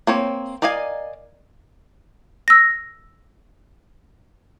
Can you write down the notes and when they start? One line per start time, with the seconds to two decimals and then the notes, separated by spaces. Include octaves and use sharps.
0.07 A#3 C4 C#5
0.62 A#4 D5 D#5 F5 G#5
2.48 E6 A#6